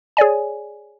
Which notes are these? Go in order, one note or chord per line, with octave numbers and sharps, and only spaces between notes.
G#4 C#5 D5 G#5